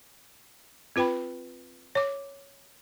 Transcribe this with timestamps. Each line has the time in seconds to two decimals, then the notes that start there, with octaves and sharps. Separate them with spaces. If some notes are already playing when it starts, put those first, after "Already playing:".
0.96 C4 F4 B4 G5 B5
1.95 C#5 D6